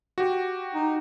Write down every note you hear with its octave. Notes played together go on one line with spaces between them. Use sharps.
F#4 G4
D#4